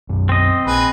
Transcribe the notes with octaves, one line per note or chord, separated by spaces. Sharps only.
B1 F#2
C4 D#5
A#1 G#4 B4